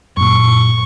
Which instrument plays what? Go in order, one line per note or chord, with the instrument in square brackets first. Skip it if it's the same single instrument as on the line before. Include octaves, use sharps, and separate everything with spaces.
[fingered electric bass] F#2 A#2 [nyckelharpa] C#6